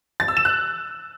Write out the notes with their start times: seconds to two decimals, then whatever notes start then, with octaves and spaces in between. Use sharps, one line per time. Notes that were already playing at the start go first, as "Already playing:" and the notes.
0.20 A6
0.28 E6
0.37 E7
0.45 F#6